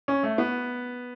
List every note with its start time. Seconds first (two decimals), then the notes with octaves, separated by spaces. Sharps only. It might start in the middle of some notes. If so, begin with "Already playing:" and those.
0.08 C#4
0.23 A3
0.38 B3